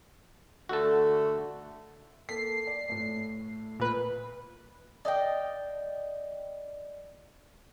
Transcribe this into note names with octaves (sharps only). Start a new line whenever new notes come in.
D3 A3 F#4 A4
A#3 A4 B6 C7
D5
A2 A3
A#2 B4
D5 D#5 F5 G5